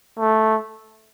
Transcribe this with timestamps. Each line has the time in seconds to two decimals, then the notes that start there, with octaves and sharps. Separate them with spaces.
0.19 A3